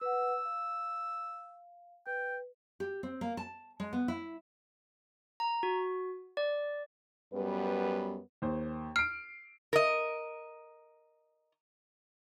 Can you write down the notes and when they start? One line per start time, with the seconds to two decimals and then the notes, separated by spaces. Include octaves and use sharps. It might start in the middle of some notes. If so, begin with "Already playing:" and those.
0.01 B4 F#5 E6
0.45 F5
2.06 B4 G5
2.80 G4
3.03 C4
3.21 A#3
3.37 A5
3.80 G#3
3.93 B3
4.08 E4
5.40 A#5
5.63 F#4
6.37 D5
7.33 F#2 G3 B3 B4
8.42 D#2 C5
8.96 F6 C7 D7
9.73 A#4 D#5